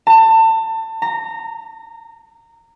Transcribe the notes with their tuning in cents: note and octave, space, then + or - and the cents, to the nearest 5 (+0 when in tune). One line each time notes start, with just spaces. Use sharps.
A5 +30
A#5 -20